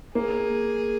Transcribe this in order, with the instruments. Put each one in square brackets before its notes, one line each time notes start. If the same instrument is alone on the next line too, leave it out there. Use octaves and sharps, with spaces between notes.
[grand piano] A#3 [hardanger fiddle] G#4